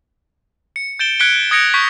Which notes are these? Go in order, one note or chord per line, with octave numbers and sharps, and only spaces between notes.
C#7
G6 A6 D7 E7 G7
F#6 G#6 B6 C#7 D7 G7
D#6 G#6 A#6 C#7 D7 F7
C#6 G6 B6